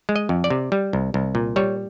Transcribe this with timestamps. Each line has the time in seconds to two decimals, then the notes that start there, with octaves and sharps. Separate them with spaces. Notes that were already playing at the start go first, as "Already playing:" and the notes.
0.09 G#3
0.16 D#5
0.29 F2
0.44 D5
0.50 C3
0.72 G3
0.93 C2
1.14 C2
1.35 A#2
1.56 G3 C#5